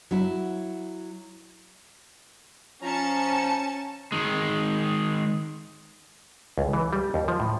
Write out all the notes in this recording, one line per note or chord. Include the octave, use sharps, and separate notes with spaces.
F#3 E4
F3 C#4 A5 A#5 C#7
D#3 G#3
C#2
E3
G3
D#2
F3
A2